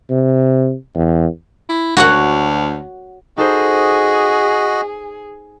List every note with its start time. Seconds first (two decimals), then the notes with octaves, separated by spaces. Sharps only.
0.10 C3
0.95 E2
1.69 E4
1.97 D2 F#4 C#5 F#5
3.37 D#4 F#4 G#4 A4 C5 D#5